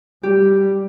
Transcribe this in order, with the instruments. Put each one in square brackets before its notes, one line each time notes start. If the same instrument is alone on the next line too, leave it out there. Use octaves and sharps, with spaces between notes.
[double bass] G3 [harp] G4